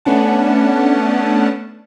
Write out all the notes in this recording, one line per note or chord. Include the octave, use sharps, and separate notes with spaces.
A3 B3 C#4 D4 F#5 A5